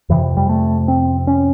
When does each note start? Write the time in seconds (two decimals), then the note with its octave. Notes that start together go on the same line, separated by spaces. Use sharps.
0.09 F2 C3 E3
0.37 G3
0.49 A3
0.88 C4
1.27 C#4